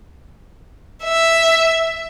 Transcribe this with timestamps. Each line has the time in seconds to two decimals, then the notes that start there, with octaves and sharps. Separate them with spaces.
1.04 E5